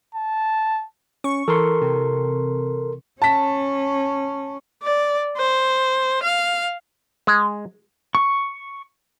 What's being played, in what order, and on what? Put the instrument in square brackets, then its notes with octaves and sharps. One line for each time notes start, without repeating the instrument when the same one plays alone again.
[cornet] A5
[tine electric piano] C#4 [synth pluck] C#6
[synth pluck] E3 [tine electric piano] A4 A#4 C6
[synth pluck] C3
[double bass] C#4 [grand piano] A5 B6
[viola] D5
C5
F5
[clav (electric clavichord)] G#3
[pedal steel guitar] C#6